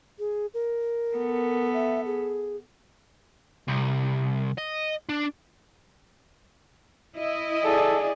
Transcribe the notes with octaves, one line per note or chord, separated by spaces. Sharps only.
G#4
A#4
B3 A4
E5
G#4
C2
D#5
D4
E4 D#5
G#4 A4 D5